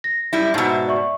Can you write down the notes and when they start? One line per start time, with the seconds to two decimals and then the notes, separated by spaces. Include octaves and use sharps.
0.04 A#6
0.33 F#2 G3 E4
0.54 G#2 B2 E5 A5 E6
0.88 D5 E5 C#6